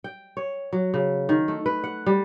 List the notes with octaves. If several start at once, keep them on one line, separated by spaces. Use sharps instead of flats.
G5
C#5
F#3
C#3
D#3
A3
B4
F#5
G3